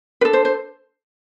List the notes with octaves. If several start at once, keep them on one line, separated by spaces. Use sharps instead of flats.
D4 A4 B4
C5
C5